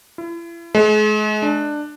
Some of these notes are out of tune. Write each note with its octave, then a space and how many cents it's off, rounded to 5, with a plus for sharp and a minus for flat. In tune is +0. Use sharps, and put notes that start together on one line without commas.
E4 +40
G#3 +40
D4 +15